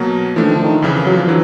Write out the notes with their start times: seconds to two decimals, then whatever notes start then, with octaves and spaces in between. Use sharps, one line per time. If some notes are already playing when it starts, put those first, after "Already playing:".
Already playing: B2 F#3 A#3
0.36 E3 F3 A3 D4
0.45 D#3
0.55 D3
0.64 D#3
0.82 F2 C#3 E3
1.06 F#3
1.17 F3
1.27 D3 E3 F#3